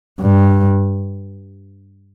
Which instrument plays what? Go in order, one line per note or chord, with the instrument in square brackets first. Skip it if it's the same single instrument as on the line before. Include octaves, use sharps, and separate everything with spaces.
[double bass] G2